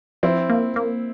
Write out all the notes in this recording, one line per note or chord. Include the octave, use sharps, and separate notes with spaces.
F3 C4 E4
A#3
A#3